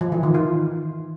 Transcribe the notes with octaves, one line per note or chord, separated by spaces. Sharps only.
F3
E3
D#3
F4